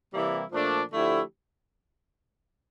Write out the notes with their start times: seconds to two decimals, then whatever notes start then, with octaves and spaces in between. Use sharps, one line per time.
0.13 C3 E3 G3 A#3 E4
0.52 A#2 F3 A3 D4
0.91 D3 F3 A3 E4 G4